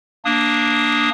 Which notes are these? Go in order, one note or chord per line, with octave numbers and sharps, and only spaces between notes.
A#3 D4 D#6